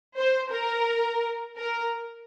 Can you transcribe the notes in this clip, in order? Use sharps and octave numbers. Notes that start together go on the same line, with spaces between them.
C5
A#4
A#4